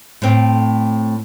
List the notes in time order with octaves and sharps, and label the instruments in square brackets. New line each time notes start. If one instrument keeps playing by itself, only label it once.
[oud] A2 C4